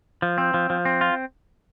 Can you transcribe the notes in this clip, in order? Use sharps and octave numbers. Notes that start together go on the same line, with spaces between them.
F3
C4
F3
F3
C4
F4